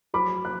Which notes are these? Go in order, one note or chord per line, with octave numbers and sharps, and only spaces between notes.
F#3 B5 D6
F#6